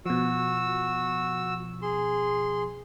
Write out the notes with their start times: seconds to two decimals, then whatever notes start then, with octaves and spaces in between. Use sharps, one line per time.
0.06 B2 F3 F#4 E6
1.82 G#4 C6